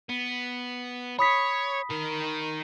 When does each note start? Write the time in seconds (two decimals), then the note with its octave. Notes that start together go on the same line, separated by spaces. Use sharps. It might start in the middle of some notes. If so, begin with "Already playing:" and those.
0.09 B3
1.19 C#5 B5 D#6 B6
1.90 D#3 A#4